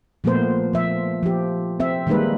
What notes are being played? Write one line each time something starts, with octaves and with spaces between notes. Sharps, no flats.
A#2 F3 A3 B3 A#4 C5
F3 E5
F3 G4
C4 E5
D#3 G3 G#3 A#3 D#4 B4